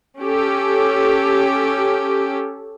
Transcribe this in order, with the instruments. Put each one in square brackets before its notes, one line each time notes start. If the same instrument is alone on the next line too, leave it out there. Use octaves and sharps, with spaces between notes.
[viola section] C#4 G4 A4